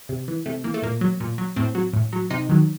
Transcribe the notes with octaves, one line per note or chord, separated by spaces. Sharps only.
C3
E3
C3 A3
E3 A#3
A3
A#2 A#3
F#3
A#2
F#3
A2 C4
F#3
A2
F#3
C3 D#4
D#3 F#3